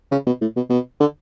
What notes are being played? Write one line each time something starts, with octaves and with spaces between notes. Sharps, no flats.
C#3
B2
A2
B2
B2
D3